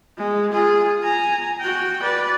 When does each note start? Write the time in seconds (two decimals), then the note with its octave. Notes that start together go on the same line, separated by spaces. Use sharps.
0.17 G#3
0.52 F4 G#4
1.02 G#5 A#5
1.60 F#4 G5
2.03 B4 D5